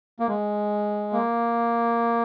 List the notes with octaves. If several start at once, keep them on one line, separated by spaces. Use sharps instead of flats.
A#3
G#3
A#3